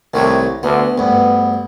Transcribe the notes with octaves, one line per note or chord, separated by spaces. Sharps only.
C2 D#3 A3 C#5
D2 B3
D2 G2 B3